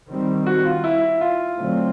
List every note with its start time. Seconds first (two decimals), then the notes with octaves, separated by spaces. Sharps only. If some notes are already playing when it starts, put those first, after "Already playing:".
0.09 D#3 G3 C4
0.46 F#4
0.65 F4
0.84 E4
1.21 F4
1.58 D3 F#3 A3 C4